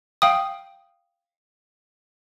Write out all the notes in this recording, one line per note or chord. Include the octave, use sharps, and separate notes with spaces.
F5 G5 D#6